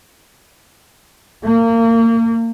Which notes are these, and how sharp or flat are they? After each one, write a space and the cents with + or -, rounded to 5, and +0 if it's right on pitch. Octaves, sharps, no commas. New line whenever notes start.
A#3 -30